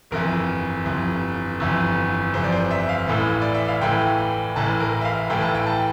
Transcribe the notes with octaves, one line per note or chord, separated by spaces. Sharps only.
G1 F2 E3 A#4
G1 F2 E3
G1 F2 E3
G1 F2 E3 C5
D5
C5
E5
F5
A1 A2 E3
D5
E5
F5
A1 A2 E3 G5
A1 A2 E3 A5
A#4
E5
F5
A1 A2 E3 G5
A5
G5
A5